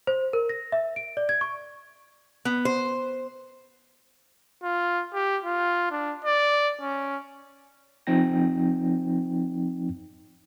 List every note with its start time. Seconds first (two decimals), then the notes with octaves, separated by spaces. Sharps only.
0.07 C5
0.33 A#4
0.49 A#6
0.72 E5
0.96 D7
1.17 D5
1.29 G#6
1.41 C#6
2.45 B3
2.65 C5
4.63 F4
5.14 G4
5.45 F4
5.91 D4
6.25 D5
6.81 C#4
8.07 F3 C4 D#4 G5 A#6